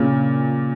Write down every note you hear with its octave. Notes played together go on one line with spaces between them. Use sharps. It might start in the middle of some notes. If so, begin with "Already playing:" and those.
Already playing: A#2 C#3